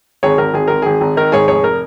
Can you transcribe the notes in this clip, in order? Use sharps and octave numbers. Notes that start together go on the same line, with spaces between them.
G#1 G#4 C#5
G#1 A#4
G#1 G#4
G#1 A#4
G#1 G#4
G#1
D#3 A#4
G#2 G#4 C#5
F1 G#4 C#5
A#4